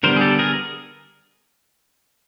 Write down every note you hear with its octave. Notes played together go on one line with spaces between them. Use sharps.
D3 G3 B3 A#4 C5
G#4
G4 A4
G#4 A#4